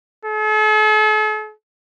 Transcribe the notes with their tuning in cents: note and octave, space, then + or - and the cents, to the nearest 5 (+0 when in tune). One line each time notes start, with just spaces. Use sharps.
A4 -45